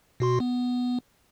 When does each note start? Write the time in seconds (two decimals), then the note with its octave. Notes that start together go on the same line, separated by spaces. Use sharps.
0.20 B2 F#4 C6
0.40 B3